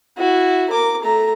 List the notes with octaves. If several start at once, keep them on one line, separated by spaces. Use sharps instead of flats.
E4 F#4
A#4 D6
A3 A#5